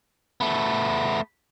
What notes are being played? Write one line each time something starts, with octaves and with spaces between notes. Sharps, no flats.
A3 B3